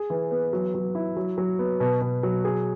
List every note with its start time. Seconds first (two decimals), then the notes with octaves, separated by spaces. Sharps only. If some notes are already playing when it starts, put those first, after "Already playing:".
Already playing: G#4
0.10 E3
0.31 B3
0.53 F#3
0.74 F#3
0.95 E4
1.16 F#3
1.38 F#3
1.59 B3
1.80 B2
2.01 B2
2.23 F#3
2.45 G#4